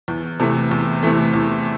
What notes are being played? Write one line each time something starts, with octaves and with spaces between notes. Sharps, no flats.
E2
C3 E3 A3
E2
C3 E3 A3
E2